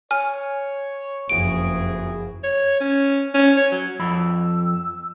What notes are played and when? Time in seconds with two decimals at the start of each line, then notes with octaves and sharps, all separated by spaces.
0.11 C#5 G#5 F6
1.29 F#1 F2 E4 F#4 G#4 D7
2.44 C#5
2.80 C#4
3.34 C#4
3.57 C#5
3.72 F#3
3.99 F2 B5 E6